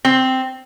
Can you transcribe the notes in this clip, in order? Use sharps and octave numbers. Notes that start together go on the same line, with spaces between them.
C4